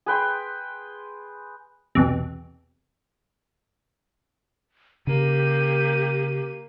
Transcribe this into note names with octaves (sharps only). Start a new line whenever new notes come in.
G#4 B4 G5 C6
B1 E2 C3
C#3 A#3 G4 D#7